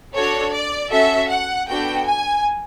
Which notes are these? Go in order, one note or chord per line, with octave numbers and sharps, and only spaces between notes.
D4 F#4 A4 C#5
D5
C#4 F#4 A4 E5
F#5
B3 D4 F#4 A4 G5
G#5